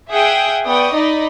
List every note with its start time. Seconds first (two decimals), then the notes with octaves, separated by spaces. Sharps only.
0.12 G#4 E5 F#5 G5 D#6
0.65 B3 D5 G5 C#6 D#6
0.94 D#4 D5 D#5 B5